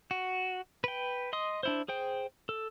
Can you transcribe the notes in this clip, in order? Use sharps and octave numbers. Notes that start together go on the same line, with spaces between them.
F#4
B4 G5
D#5 C6 D#6
D4 E4 C5
G#4 C5 G5
A4